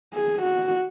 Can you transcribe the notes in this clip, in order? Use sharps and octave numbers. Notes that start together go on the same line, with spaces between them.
G#4
F#4